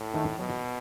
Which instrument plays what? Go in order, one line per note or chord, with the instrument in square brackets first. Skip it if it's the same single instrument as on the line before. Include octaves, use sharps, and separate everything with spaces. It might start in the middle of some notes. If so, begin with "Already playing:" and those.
Already playing: [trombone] A2
[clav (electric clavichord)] D#3 A3
[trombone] B2 [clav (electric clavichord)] F#3